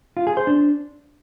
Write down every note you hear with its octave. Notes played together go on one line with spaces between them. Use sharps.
F4
G#4
C5
D4